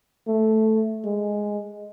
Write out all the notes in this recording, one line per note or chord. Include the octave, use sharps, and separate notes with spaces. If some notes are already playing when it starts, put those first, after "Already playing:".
A3
G#3